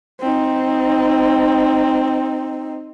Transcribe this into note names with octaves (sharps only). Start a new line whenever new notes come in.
C4 D#4